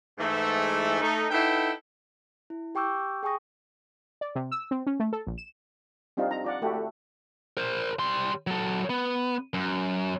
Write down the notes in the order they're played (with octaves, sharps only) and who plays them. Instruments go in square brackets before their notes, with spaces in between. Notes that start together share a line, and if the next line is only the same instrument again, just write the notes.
[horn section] G#2 E3 A3
A3 D#4
D#4 E4 A4 B4 F#5 G5
[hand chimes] E4
G4 G5 C#6 D6 E6 G6
G#4 G5 G#5 C#6 D#6 A#6
[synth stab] D5
C3
E6
C4
C#4
A3
A4
A#1
E7
[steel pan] G3 C4 D4 D#4 F4
A#5
F4 D5 F#5
A3 E4 F#4 G4 A4
A3
[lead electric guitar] A#4 C5
G3 C6
F#3 A4
B3
F#2